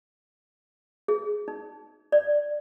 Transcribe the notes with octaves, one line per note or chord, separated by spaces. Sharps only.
G#4
D#4
D5